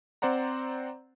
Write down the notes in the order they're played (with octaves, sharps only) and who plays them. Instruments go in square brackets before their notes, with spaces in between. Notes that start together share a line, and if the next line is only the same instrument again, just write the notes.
[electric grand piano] C4 C5 D5 F#5 A#5